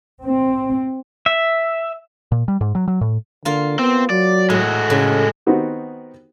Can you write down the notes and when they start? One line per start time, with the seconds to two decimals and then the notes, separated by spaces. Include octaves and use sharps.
0.22 C4
1.26 E5
2.32 A#2
2.48 G3
2.61 G#2
2.75 F#3
2.88 F#3
3.01 A2
3.45 D3 A#3 F4
3.79 B3 C4
4.10 F#3 D5
4.50 A2 G#3 F#4
4.90 A2 C#3
5.46 D#3 B3 C4 D#4 F#4 G4